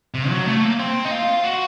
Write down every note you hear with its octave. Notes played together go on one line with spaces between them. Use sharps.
C3
F#3
A3
A#3
C4
D#4
F4
F#4